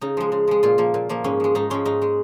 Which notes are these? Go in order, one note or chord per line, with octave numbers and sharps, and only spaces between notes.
C#3 D#4
F3 G#3
C#3
F3 G#3
A#2 F4
F3 A#3
A#2
F3 A#3
G#2 C#4
F3 G#3
G#2 D#4
F3 G#3 C#4
G#2 D#4
G#3